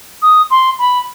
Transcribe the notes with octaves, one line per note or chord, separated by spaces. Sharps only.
D#6
C6
B5